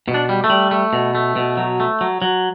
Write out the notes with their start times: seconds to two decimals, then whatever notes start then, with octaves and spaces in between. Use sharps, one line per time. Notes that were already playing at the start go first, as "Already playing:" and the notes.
0.08 B2
0.14 D4
0.29 G3
0.44 A3
0.50 G3
0.71 A3
0.93 B2
1.15 A3
1.36 B2
1.57 F#3
1.80 A3
2.01 F#3
2.22 F#3